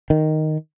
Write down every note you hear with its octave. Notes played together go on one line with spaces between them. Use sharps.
D#3